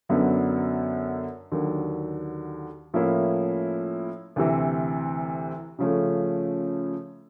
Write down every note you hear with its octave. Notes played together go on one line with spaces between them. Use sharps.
F#2 D3 F#3 B3
D#2 D3 F#3
A2 F3 A#3 C#4 E4
D2 C3 E3
C#3 F3 A3 C#4